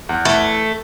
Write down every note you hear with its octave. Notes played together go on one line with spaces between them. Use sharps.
E2
E3 A3